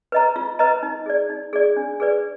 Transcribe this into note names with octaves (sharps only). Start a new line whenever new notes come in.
B4 D#5 A#5
F4
B4 D#5 A#5
D#4
G#4 D5
D#4
G#4 D5
D4
G#4 B4 D5